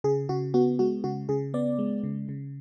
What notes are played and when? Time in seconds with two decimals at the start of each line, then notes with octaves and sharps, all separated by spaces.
0.04 C#3 G#4
0.29 C#3 F#4
0.54 B3 F#4
0.79 G#3 F#4
1.04 C#3 F#4
1.29 C#3 G#4
1.54 B3 D5
1.79 G#3
2.03 C#3
2.29 C#3